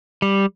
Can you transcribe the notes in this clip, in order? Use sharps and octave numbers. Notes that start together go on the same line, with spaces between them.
G3